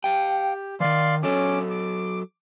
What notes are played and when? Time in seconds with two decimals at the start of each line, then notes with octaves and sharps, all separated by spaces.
0.04 G4 F5 G5
0.80 D#3 E3 D5 F5 C6
1.23 F#3 C#4 A4 D6
1.70 D6